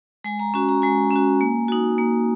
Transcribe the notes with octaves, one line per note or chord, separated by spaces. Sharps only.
G#3 G#5
A#5
C#4 F#4 C#6
A#5
G#3 G#5
C#4 F#4
A#3
D#4 F#4
A#3